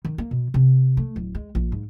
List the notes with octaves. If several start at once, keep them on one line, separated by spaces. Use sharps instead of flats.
D#3
A#3
B2
C3
A3
D1
G#3
A#1
G#2